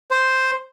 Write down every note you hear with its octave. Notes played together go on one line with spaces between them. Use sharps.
C5